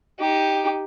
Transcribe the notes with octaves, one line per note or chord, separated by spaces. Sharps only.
D#4 G4